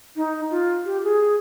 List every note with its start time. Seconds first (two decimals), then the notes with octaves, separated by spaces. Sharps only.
0.16 D#4
0.51 F4
0.85 G4
1.03 G#4